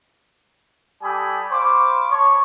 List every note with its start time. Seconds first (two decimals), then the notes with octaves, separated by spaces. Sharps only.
1.02 G3 G4 A4 G#5 B5 D#6
1.51 C5 F5 B5 C#6 D6
2.11 C#5 A5 B5 C#6